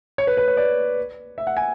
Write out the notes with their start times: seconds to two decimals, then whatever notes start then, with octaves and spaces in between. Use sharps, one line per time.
0.18 C#5
0.27 B4
0.37 B4
0.48 C#5
0.57 D5
1.38 E5
1.47 F#5
1.57 G#5